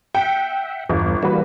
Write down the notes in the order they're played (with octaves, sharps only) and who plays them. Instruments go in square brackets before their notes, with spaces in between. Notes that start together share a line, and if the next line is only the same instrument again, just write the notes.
[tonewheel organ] E5 F#5 [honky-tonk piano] G5
[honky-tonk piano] G1 [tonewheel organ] E2 G2 F4
[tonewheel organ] E3 G3 A#3 [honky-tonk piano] F#4 B4